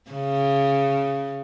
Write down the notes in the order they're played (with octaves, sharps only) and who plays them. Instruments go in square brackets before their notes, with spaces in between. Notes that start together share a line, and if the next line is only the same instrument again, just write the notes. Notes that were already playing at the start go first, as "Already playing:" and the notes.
[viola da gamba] C#3